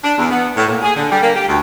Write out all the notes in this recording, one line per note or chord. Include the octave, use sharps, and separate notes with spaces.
D4
E2
B3
A2
A#2
G#4
D3
G3
A#3
G4
D2